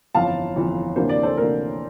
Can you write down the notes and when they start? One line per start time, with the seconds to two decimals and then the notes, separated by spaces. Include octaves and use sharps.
0.15 G1 F2 E3 F5 A5
0.56 G1 F2 E3
0.96 D2 C3 E3 A#3 D4 C5
1.09 D5
1.23 A4 C5
1.37 D2 C3 E3 A#3 D4 A#4 D5